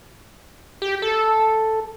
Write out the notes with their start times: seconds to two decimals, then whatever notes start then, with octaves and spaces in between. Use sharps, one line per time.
0.82 G4
1.02 A4